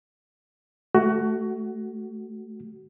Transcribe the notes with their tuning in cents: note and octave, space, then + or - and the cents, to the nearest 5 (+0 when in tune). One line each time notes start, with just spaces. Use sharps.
A3 +0 F#4 +20